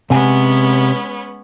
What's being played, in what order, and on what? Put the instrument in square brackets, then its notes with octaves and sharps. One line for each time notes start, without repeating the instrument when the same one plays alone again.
[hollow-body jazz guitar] C3 F#5 G#5 [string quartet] G#3 B3 C#4